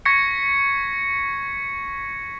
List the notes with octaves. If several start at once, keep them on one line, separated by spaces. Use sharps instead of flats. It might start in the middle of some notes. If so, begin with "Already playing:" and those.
C#6 G#6 A#6 B6 C#7